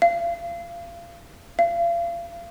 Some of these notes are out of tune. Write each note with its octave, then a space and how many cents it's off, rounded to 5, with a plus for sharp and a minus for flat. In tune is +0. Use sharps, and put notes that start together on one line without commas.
F5 -30
F5 -35